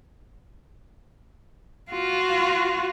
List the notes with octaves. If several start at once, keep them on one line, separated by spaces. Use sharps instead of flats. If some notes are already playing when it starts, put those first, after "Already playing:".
F4 F#4